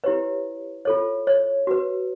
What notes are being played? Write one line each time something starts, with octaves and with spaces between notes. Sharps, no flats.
E4 G4 B4 C#5
F4 A4 C#5
C#5
F#4 B4